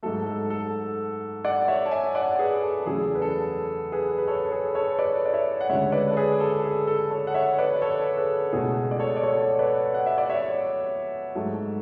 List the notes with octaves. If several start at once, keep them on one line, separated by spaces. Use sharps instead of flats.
G#2 F#3 A3 A4
A4
A4
D5 F#5
C#5 E5
A5
E5 G#5
D5 F#5
G#4 B4
A4
E2 C#3 F#3 A3 G#4
B4
A4
G#4 B4
B4
A4 C#5
G#4 B4
A4 C#5
B4 D5
D5
C#5 E5
F#5
D2 C#3 G#3 C#5 E5
B4 D5
A4
G#4 B4
A4
G#4
A4
A4 C#5
F#5
C#5 E5
B4 D5
B4
A4 C#5
G#4 B4
C#2 B2 A3 G#4
D5
A4 C#5
D5
A4 C#5
B4 D5
F#5
E5
D5
C#5 E5
G#2 F#3 A3